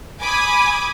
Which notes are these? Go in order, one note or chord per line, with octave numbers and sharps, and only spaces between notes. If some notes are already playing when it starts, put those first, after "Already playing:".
G#5 B5 D6 D#6 G#6